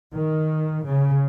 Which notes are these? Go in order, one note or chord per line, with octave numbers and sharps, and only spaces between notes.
D#3
C#3